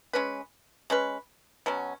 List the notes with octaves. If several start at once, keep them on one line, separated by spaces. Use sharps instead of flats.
G#3 C#4 B4
G#3 C#4 B4
B2 F#3 C#4